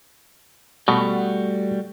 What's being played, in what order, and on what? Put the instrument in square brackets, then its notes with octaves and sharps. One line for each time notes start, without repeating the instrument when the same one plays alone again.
[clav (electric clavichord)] B2 [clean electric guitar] G3 A3 F#4